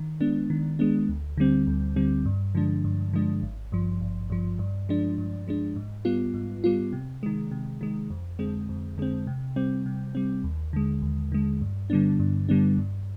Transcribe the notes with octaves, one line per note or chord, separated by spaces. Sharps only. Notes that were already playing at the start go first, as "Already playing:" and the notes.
Already playing: D#3
G#3 B3 D4
D#3
G#3 B3 D4
D2
D3 G3 C4
D2
D3 G3 C4
G2
D3 F3 G#3 D4
G2
D3 F3 G#3 D4
G#1
G2 F3
G#1
G2 F3
G2
F3 G#3 D4
G2
F3 G#3 D4
G#2
G3 B3 F4
G#2
G3 B3 F4
C3
D#3 G#3
C3
D#3 G#3
F2
D3 G#3 C4
F2
D3 G#3 C4
C3
G3 C4
C3
G3 C4
D#2
D3 G#3
D#2
D3 G#3
G2
D3 G3 B3 D4
G2
D3 G3 B3 D4
G2